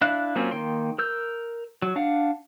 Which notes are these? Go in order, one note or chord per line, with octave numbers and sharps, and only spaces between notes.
D4 E4 E5 F5 F#6
F#3 A#3 C4 C#4 F4
D#3 A#3 G5 C6
A#4 E6 G6
F#3
D4 F5 F#5